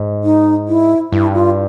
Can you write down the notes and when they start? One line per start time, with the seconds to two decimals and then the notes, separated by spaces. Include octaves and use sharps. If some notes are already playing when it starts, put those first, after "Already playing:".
Already playing: G#2
0.24 D#4
0.68 E4
1.12 G2 E4
1.34 F4